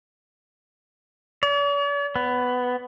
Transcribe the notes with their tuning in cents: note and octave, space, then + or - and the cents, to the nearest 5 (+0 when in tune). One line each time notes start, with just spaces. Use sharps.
D5 -45
B3 +10